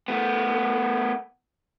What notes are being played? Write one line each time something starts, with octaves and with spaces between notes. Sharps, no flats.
A3 B3